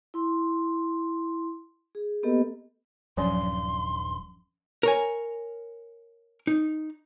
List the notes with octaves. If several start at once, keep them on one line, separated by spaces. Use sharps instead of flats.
E4 C6
G#4
A#3 B3 G4 A4 B4 D#5
D#1 G2 F3 F#3 C#4 C6
A#4 C#5 G#5
D#4